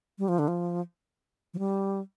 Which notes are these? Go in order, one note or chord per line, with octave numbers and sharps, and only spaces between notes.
G3
F3
D3
F3
F3
G3